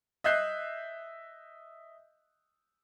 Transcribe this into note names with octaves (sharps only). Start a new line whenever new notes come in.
D#5 E5 F#6 G6 C7